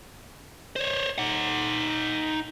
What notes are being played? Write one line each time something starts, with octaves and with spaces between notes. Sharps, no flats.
C5 C#5
D#4 F#5